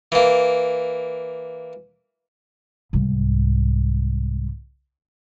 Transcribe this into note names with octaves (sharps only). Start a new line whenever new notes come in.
E3 A#3
C2 G#2